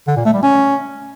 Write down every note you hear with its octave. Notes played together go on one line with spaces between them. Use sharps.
D3
A#2
A3
G3
C#4